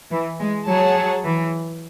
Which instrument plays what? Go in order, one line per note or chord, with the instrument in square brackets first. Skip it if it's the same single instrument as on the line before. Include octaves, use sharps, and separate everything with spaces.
[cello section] E3
G#3
[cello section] F#3 [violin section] G#4 C#5 F#5 A5
[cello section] F#3
E3